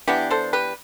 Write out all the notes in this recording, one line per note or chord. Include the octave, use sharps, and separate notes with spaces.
E3 B3 D4 E4 G4
A4 C5
G4 B4